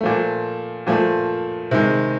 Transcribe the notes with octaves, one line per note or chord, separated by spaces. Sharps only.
A#2 F3 A3
A#2 F3 A3
C3 D#3 G#3